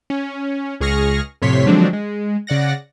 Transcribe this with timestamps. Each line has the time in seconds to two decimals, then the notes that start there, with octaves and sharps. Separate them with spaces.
0.10 C#4
0.81 C#2 G#4 C#6 F6 A#6
1.42 F2 A2 C3 C#5 C6 B6
1.66 D3 F3 F#3 G#3 C4 D4
1.93 G#3
2.47 C#3 D5 F#5 A#6